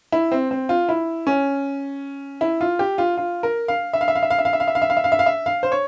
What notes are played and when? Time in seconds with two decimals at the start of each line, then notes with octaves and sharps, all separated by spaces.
0.12 E4
0.32 C4
0.51 C4
0.69 F4
0.89 E4
1.27 C#4
2.41 E4
2.61 F4
2.79 G4
2.98 F4
3.17 F4
3.43 A#4
3.68 F5
3.93 E5
4.01 F5
4.08 E5
4.15 F5
4.23 E5
4.30 F5
4.38 E5
4.45 F5
4.53 E5
4.60 F5
4.68 E5
4.75 F5
4.82 E5
4.90 F5
4.97 E5
5.04 F5
5.12 E5
5.19 F5
5.26 E5
5.46 F5
5.63 C5
5.72 C#5